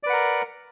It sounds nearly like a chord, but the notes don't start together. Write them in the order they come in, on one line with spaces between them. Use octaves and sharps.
D5 B4 F#5 A#4